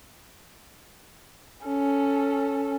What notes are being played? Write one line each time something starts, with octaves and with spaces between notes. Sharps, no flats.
C#4 A4